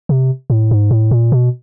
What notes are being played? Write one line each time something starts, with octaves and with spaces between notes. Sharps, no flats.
C3
A2
G#2
A2
A#2
B2